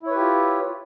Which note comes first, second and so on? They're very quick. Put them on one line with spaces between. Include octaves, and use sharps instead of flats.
E4 C#5 B4 G4 F4